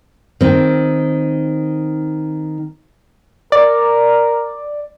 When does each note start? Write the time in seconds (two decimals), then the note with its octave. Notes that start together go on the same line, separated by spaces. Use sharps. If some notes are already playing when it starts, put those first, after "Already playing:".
0.41 D#3 C4
3.52 A#4 D5